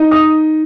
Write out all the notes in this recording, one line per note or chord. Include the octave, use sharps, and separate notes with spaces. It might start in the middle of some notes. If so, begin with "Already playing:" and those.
Already playing: D#4
D#6